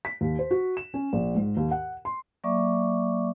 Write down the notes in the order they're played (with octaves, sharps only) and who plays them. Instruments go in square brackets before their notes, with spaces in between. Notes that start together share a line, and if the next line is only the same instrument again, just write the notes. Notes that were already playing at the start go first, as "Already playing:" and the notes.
[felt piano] B6
D#2
C5
F#4
E7
C#4
A#1
G#2
D#2
F#5
C6
[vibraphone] F#3 A#3 D5 E5 C#6 D6